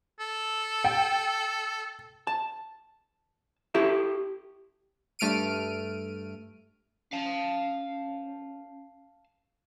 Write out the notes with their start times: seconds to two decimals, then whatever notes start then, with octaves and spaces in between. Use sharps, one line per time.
0.20 A4
0.84 G5
2.27 A5
3.74 E4 G4 A4
5.19 G2 A3 F6 D7 D#7
7.13 C#4 F5 A5